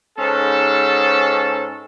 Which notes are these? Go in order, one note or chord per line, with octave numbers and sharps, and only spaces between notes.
G#2 C#4 A4